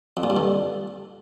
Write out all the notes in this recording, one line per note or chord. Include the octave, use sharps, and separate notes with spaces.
F2
A#2
G2
D3